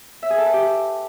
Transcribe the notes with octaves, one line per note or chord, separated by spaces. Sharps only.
E5
G#4
A4
B4
G4